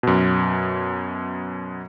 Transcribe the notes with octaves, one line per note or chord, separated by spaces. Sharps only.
F#2 B2